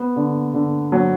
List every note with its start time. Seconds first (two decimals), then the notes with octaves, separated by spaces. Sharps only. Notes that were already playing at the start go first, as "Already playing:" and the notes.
Already playing: B3
0.16 D3
0.54 D3
0.92 F#3